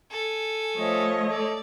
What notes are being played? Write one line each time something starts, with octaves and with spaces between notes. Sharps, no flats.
A4 G#5
F3 A3 C#5 D#5
A4 D5